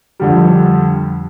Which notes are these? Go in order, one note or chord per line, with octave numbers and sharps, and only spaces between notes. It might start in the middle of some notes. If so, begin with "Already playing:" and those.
F2 D3 G3